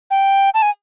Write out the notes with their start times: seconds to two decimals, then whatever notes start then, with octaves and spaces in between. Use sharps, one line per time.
0.11 G5
0.54 A5
0.62 G#5